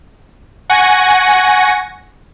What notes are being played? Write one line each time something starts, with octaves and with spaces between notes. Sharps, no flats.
F#5 G#5 C#6 A#6